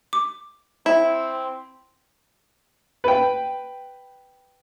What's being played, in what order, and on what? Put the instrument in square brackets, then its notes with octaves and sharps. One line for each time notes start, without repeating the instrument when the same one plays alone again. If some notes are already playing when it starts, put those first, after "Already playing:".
[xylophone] D6
[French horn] C4 [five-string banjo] E4
[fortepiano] B4 G5